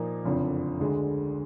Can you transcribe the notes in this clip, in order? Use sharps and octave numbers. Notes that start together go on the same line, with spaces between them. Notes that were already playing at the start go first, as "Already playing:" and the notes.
Already playing: A#2 F3 A#3 D#4
F#1 F2 D3 F3
D2 D3 G#3